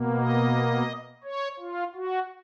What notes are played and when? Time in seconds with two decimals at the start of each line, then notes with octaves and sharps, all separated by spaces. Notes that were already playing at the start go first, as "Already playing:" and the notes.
Already playing: B2 A#3
0.19 D#5
1.24 C#5
1.59 F4
1.95 F#4